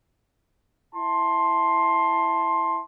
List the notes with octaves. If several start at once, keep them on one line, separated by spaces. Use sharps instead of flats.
E4 A5 C6